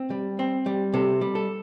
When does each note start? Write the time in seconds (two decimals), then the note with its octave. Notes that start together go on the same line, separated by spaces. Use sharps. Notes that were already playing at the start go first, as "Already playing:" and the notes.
Already playing: C4
0.10 G3
0.39 C4
0.66 G3
0.94 C3 A4
1.21 G3
1.35 A4